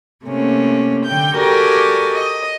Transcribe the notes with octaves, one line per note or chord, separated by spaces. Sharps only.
C3 A3 A#3 C#4
D3 G5 G6
F#4 G4 A4 A#4 D5 G#5
D#5